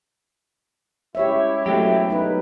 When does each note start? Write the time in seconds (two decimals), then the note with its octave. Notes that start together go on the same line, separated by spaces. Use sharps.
1.15 C#3 G#3 E4 G4 C#5 E5
1.66 B1 G#2 F#3 A3 G4
2.10 D#4 B4